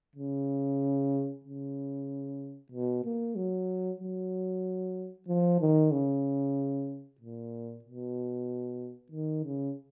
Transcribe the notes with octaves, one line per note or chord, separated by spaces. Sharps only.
C#3
C#3
B2
A#3
F#3
F#3
F3
D#3
C#3
A#2
B2
D#3
C#3